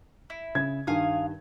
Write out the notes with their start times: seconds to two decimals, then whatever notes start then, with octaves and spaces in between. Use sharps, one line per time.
0.30 E4
0.55 C#3 G#6
0.87 G2 D#3 F5 G#5 D#6